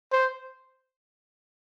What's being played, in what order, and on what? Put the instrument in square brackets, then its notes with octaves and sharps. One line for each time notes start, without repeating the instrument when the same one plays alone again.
[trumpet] C5